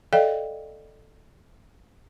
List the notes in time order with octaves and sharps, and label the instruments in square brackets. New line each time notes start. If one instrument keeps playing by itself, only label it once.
[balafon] A4 D5 D#5 F5 G5